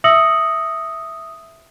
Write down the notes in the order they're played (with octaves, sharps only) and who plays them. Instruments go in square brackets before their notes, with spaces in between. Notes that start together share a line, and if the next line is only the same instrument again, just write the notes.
[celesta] E5 D#6 E6 A#6 C#7 F#7